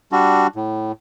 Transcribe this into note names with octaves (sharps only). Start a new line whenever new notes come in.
G3 D4 F#4
A2